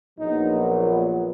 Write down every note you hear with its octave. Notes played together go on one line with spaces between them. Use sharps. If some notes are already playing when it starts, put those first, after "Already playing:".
A#1 A#2 F#3 B3 D#4